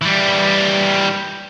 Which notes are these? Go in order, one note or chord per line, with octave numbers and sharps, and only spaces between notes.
E3 G3